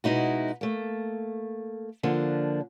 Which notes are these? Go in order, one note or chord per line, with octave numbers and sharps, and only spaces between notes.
B2 G#3 D#4 E4 F#4
A3 A#3
D3 F3 A#3 D4